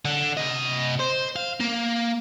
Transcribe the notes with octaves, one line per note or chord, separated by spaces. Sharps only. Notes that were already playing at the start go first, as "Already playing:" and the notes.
D3
C3 D#5
C5
F5
A#3